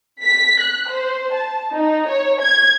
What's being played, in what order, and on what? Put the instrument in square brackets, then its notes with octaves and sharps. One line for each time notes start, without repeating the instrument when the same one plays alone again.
[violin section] B6
F#6
C5
A5
D#4
C#5
G#6